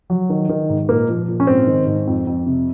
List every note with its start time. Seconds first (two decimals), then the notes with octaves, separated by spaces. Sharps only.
0.10 F#3
0.30 D#3
0.49 D#3
0.70 G#2
0.89 A#2 A#3
1.09 F3
1.28 A#2
1.40 C#4
1.47 G#2 C4
1.67 D#3
1.86 G#2
2.07 F2
2.27 F2
2.46 C3